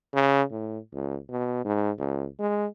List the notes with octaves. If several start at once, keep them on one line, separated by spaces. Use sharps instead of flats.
C#3
A2
C#2
B2
G#2
C#2
G#3